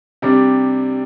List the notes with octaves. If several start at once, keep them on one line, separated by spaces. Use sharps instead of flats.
C3 G3 D4